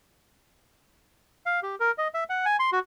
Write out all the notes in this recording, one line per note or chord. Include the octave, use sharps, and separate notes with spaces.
F5
G4
A#4
D#5
E5
F#5
G#5
C6
F#4